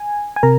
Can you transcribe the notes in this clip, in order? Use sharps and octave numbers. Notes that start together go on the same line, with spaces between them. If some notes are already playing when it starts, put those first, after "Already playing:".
Already playing: G#5
G#5
C3 A#4 A#5